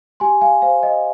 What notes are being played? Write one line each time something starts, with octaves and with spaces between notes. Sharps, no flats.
G4 G#5 C6
F5 G#5
C5 F5
D#5